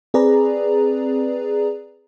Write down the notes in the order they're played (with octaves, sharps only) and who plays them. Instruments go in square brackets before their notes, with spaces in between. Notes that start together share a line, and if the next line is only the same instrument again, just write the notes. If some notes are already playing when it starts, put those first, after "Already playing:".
[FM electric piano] C4 G#4 B4 D5 A#5